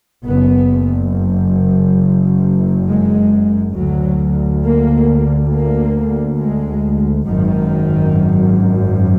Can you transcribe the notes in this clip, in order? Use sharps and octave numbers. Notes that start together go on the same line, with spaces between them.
F#1 F#2 B3
G#3
D2 F#3
A#3
A#3
G#3
G#1 F#2 D#3